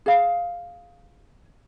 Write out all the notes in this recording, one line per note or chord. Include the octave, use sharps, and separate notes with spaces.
G#4 F5